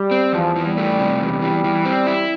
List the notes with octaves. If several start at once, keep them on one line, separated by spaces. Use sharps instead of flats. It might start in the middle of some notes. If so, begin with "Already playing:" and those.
Already playing: G3
C4
E2 F3
E3
G3
A3
C3
E2
E3
E3
C4
E4